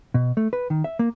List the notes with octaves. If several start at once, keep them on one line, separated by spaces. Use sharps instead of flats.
B2
A3
B4
D#3
E5
A#3